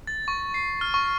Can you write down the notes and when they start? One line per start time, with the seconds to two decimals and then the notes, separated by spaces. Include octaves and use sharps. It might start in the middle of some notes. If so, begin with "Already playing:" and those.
0.07 A6
0.28 C#6
0.54 C7
0.81 F6
0.94 C#6